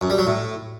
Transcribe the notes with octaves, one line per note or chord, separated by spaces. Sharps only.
F#2
G3
F#3
A2